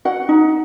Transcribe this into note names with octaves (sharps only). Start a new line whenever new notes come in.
F#4 F#5
D#4